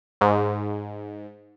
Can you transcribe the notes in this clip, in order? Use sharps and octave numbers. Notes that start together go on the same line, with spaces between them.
G#2